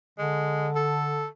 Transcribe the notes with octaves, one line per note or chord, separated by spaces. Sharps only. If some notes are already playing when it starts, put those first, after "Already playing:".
D3 G#3
A4